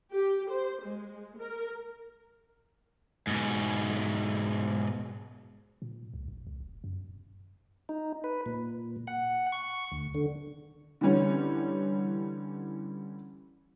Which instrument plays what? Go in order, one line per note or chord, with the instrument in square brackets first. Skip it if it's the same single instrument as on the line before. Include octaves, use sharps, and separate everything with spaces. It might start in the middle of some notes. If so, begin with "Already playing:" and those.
[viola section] G4
C5
G#3
A#4
[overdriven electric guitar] G#2 B2
[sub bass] A#2
C#2
A1
C#2
E1
F#2
[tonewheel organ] D#4
B4
A#2
F#5
C#6
D2
D3
[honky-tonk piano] D3 E3 G3 C#4